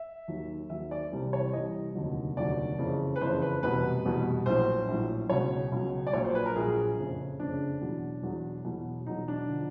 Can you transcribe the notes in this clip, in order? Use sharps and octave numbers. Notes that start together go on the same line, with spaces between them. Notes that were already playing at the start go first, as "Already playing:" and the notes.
Already playing: E5
D#2 D#3 F#3
D#2 D#3 F#3 E5
D5
C2 C3 E3 G3
C#5
C2 C3 E3 G3 D#5
F1 D#2 D3 F#3
F1 D#2 D3 F#3 D5
F#1 F2 C#3 E3
B4
F#1 F2 C#3 E3 C5
B4
F1 E2 B2 G3 B4
F1 E2 B2 G3
A#1 A2 F#3 C5
A#1 A2 F#3
C#2 B2 F#3 C#5
C#2 B2 F#3
D5
A#1 A#2 F#3 C#5
C5
B4
A#4
A#1 A#2 F#3 G#4
F#1 F2 C#3
F#1 F2 C#3 D4
E2 B2 F#3
E2 B2 F#3
E2 B2 F#3
E2 B2 F#3 D#4
D4
D3 F3